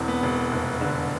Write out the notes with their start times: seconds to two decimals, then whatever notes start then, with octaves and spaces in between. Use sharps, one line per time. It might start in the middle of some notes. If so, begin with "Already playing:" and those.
Already playing: E1 E2 C4
0.08 B3
0.23 E1
0.52 F1
0.81 D3